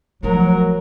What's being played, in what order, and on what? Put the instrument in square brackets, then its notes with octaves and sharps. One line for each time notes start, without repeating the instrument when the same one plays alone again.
[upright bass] F3 A3 [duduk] F#3 [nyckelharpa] A#4